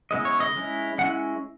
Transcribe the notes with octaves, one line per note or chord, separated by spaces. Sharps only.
C#3 G#3 B3 E4 D#5
C#5
D#5
G#3 C#4 E4
G#3 C#4 E4 F#5